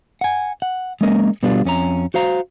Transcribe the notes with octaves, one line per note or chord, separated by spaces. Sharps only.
F#5 G#5
F#5
G#3 A#3 C#4 A#4 D#5
B2 G3 B3 D4 F4
F2 C#4 G#4 A#5
F#4 C5 F5 A#5